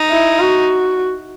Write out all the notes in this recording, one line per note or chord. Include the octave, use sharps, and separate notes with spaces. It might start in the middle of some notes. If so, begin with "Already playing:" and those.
Already playing: D#4
E4
F#4